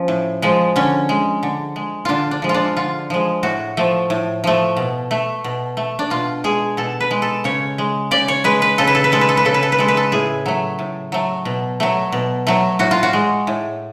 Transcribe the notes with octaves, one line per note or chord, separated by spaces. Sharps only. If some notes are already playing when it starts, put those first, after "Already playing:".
Already playing: F3 C#4
A2
F3 G#3
D3 C#4
G#3
D3
G#3
D3 D4 F4
D4
F3 G#3
F4
D4
D3 F4
F3 G#3
A2 F#4
F3 A3
A2
F3 A3
B2
A3
B2
A3
D4
B2 F4
G#3 G#4
B2 A4
B4
G#3
A4
C#3 C#5
G#3
C#3 D5
C#5
G#3 B4
B4
C#3 A4
B4
A4
B4
G#3 A4
B4
A4
B4
C#3 A4
B4
A4
B4
G#3 A4
B4
A4
A2 G#4
F#3 A3
A2
F#3 A3
B2
F#3 A3
B2
F#3 A3
A2 F#4
F4
F#4
G#3
A2